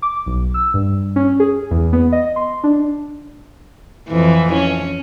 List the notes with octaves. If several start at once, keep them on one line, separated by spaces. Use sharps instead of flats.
D6
B1
E6
G2
C#4
G#4
E2
B3
D#5
C6
D4
F2 E3
C#4